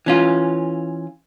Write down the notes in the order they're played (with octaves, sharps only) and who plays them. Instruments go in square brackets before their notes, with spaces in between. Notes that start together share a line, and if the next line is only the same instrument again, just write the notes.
[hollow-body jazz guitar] E3 C#4 F4